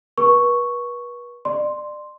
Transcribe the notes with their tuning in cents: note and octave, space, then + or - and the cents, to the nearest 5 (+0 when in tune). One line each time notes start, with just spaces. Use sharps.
B4 -40 C#6 +0
D5 +30 C6 +0